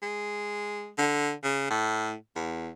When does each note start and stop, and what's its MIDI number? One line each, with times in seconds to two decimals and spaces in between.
0.02 0.90 56
0.98 1.32 50
1.43 1.66 49
1.70 2.14 45
2.36 2.70 40